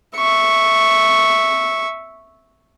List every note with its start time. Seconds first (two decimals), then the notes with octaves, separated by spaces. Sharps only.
0.16 E5 C#6